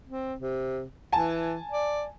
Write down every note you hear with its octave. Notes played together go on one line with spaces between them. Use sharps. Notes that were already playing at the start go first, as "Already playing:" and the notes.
C4
C3
E3 G#5 A5
D5